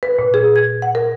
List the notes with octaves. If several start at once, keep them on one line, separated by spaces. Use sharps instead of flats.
B4
A#2
G#4
G#6
F#5
A#4